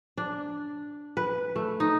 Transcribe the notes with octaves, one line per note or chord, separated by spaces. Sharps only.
D4
B4
A3
D#4